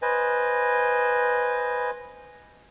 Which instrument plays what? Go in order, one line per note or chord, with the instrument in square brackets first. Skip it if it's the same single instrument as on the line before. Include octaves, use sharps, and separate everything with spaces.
[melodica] B4 C5 D#5 G#5